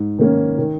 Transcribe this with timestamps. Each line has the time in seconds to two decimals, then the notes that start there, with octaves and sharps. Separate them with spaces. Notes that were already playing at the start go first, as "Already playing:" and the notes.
Already playing: G#2
0.19 D#3 A#3 C#4
0.58 D#3